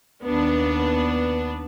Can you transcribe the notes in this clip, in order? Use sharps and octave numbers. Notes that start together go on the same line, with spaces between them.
D#2 B3 D4